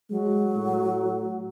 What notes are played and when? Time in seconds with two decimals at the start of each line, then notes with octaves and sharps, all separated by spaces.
0.10 F#3 G#3
0.55 A2